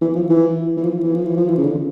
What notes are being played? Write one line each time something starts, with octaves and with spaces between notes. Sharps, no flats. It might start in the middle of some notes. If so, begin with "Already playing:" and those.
E3
F3
E3
E3
F3
E3
F3
E3
F3
E3
C#3
D3